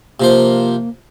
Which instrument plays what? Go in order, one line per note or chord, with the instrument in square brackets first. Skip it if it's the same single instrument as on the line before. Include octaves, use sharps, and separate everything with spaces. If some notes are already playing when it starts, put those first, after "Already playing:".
[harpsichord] C3 F3 C5 [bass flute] A#3